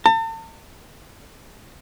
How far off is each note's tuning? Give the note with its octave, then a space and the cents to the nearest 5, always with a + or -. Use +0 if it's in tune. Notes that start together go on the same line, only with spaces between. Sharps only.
A5 +40